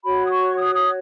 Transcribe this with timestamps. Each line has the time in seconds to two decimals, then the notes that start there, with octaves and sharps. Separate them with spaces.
0.03 F#4 C#5 B5
0.25 D#6
0.30 C#6
0.56 D#6
0.74 D#6